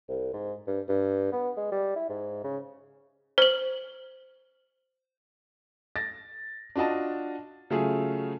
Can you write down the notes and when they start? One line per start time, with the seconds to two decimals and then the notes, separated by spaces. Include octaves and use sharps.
0.09 C2
0.33 G#2
0.67 G2
0.89 G2
1.32 B3
1.57 G#3
1.72 G3
1.96 E4
2.10 G#2
2.44 C#3
3.38 C5 F#7
5.96 A6 A#6
6.75 D4 F4 F#4 D#5 A5
7.70 C#3 F#3 A3 F4 G#4